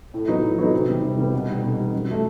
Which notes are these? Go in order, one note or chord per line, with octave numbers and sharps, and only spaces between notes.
A2
F#3 B3 D#4
A2
F#3 B3 D#4
C3
D#3 G3 B3
C3
D#3 G3 B3
B2
G3 D#4
B2
G3 D#4
F#2
F#3 A3